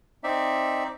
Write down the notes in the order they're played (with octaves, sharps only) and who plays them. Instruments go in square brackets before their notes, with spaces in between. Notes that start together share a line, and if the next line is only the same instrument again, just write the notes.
[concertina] C4 D#4 D5 E5